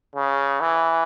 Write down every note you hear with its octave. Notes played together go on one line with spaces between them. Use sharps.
C#3
E3